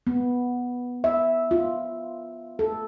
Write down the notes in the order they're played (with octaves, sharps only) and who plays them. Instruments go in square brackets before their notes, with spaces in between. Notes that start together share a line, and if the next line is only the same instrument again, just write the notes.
[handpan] B3
E5
F4
A4